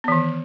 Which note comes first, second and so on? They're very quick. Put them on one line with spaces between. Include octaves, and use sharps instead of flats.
B3 E3 D#3